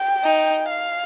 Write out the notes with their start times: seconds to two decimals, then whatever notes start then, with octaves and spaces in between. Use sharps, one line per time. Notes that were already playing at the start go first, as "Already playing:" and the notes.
Already playing: G5
0.23 D#4
0.71 F5